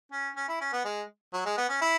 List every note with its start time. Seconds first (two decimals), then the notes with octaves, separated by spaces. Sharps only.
0.12 C#4
0.37 C#4
0.49 E4
0.61 C#4
0.73 B3
0.85 G#3
1.33 F#3
1.46 G#3
1.58 B3
1.69 C#4
1.81 E4